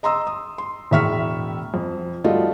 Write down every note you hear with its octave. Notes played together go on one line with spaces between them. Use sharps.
D#5 A#5 C6 D#6 E6
D#6
C6
E1 A2 E5 C#6 F6 B6
F2
F3 G3 A3 F4 F#4 D#5